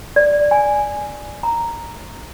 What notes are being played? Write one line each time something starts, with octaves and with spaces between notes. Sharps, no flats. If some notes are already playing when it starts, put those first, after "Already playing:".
D5
G#5
A#5